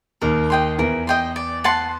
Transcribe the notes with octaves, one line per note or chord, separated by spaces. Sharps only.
D#2 D#3 A#4
D#5 G5 C6
E2 E3 A#4
D#5 G5 C6
D5
F#5 A5 C6